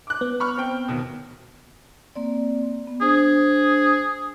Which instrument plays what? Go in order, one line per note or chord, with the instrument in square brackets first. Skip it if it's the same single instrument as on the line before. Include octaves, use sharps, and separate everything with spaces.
[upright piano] D6 F#6
[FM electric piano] B3
[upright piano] B5 C#6 F6
C4 G5
D#2 B2
[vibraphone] A#3 C4 D5
B3
[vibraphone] D4 C5 [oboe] G#4